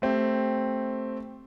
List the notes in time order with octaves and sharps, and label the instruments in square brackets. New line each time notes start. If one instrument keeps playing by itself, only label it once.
[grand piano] A3 C4 G4